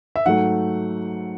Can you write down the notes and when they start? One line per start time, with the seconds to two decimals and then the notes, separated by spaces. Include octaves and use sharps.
0.16 E5
0.25 G#2 F#3 A3 F#5